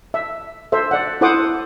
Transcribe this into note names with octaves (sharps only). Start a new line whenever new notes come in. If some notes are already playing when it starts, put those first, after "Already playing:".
E5
A4 C5 E5
D5 F#5
E4 A4 C5 F#5 D6 D#6